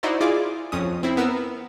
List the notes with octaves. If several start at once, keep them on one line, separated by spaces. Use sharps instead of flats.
D#4 E4 F#4 C5 D5
E4 F4 G#4 D5 D6
F2 C#4 D#6
C4 E4
B3 A#4 E6